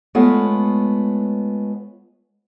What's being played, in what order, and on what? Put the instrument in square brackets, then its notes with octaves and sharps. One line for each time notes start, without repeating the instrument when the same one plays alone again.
[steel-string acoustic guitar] G#3 A3 B3 F4 C#5